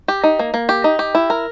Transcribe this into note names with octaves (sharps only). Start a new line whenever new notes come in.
G4
D#4
A#3
A#3
G4
D#4
G4
E4
A#4